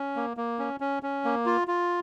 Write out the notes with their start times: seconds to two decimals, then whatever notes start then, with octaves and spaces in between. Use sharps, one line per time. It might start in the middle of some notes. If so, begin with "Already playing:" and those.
Already playing: C#4
0.16 A#3
0.37 A#3
0.59 C#4
0.80 C#4
1.03 C#4
1.25 A#3
1.46 F4
1.68 F4